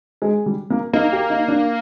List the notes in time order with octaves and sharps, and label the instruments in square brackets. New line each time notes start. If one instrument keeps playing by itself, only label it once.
[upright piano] G#3
G3
A#3
[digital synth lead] A#3 [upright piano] D#4
[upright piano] G4
D#4
D4